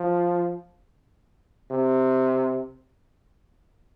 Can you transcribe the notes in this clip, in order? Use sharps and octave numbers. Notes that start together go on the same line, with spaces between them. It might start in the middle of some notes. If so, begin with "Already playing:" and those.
Already playing: F3
C3